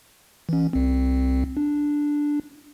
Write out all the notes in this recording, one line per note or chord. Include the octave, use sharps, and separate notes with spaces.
E3 C#4
C2 C4
D4